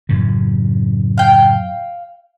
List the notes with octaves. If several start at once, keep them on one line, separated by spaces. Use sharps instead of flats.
F#2 A2 C#3
F5 G5